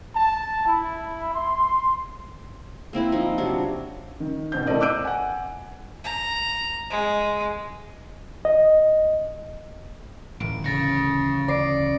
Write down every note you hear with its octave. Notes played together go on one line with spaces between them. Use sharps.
A5
E4
C6
A#3 C4 E4 B4
F3 D#4
C3 F#3 D4
D#3
B2 D#3 C4 G6
A3 C4 E4 A#4 D5 D#5
D6 E6 F#6 G6 D7 D#7
F#5 G#5
A#5
G#3
D#5
D1 A1 D7
C#3 A6 A#6 C#7
D5 A#6 C7 D7